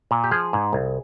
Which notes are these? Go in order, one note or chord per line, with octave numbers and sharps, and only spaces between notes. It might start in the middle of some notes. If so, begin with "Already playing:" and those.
A#2
G4
F3 G#4
G#2
C2